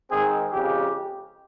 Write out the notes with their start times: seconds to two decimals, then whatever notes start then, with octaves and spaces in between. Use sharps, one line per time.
0.10 G#2 D#3 G#3 C4 G#4
0.51 F2 C#3 G#3 G4